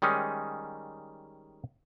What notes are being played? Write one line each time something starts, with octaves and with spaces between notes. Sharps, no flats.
D#3 G3 G#3 C#4 D#4